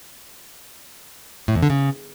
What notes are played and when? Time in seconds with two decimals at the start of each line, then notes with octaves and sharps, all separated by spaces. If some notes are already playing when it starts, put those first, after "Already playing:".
1.48 A2
1.55 E2
1.63 D3
1.70 C#3